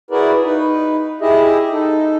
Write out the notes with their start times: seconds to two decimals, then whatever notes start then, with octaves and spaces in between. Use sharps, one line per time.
0.11 E4 F#4 G#4 A#4 B4 D5
0.44 D#4 B4
1.21 E4 G4 G#4 D#5 E5
1.72 D#4 A4